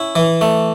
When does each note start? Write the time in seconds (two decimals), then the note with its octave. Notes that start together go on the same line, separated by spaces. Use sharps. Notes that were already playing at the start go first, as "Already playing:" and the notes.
Already playing: C#4 E4
0.16 E3
0.41 A3